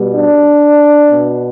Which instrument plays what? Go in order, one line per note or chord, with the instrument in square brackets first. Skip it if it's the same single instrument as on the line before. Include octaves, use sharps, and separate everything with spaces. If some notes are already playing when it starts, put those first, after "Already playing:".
Already playing: [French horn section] B2 G3 B3
D4
B2 B3